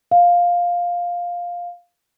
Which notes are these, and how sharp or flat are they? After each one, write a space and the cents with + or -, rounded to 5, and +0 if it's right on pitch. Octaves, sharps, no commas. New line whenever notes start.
F5 +5